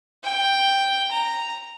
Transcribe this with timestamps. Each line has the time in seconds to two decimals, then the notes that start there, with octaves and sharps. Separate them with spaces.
0.24 G5
1.11 A#5